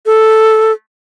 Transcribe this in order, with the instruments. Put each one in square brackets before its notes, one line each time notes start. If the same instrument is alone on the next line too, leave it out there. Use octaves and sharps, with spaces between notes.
[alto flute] A4